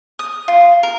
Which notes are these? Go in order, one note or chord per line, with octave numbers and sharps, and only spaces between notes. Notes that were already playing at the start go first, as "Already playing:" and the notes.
D#6
F4
A#4